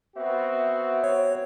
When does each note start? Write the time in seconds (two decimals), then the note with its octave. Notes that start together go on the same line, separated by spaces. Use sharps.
0.16 B3 C4 F#4 E5
1.04 C#5